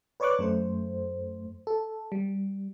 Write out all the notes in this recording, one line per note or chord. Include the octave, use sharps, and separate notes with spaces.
B4 C#5 D5 C#6 D6 F#6
F#2 A3 C5
A4
G3